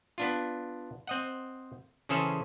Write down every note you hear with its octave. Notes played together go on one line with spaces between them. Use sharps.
B3 D4 F4
C4 D#5 F#5
C#3 E3 C#4 G#4 A4 C5